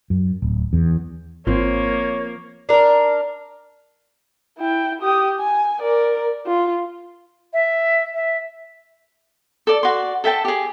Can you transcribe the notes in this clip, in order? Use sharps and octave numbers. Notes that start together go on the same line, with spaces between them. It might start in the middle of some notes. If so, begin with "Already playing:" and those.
F#2
D1
E2
G#1 F3 A#3 C4 C#5
D4 A#4
E4 G5
G4 D#6
G#5
A#4 D5
F4
E5
E5
A4 D5
F#4 D5 C6
A4 E5 G5 A5
G4 G#4